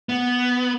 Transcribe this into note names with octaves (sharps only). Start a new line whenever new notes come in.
B3